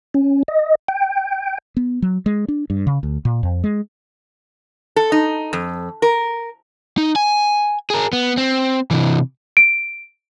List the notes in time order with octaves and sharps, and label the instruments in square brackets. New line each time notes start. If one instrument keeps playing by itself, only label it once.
[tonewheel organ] C#4
D#5
G5
[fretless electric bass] B3
F#3
G#3
D4
G2
C#3
D2
A#2
F2
G#3
[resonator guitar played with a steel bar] A4
D#4
F2
A#4
[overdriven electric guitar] D#4
G#5
G#4 A#4
B3
C4
C3 E3
[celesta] D7